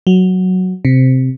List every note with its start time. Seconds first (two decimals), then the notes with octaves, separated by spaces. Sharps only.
0.07 F#3
0.85 C3